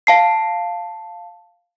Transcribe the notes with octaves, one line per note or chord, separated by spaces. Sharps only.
F5 A5 C7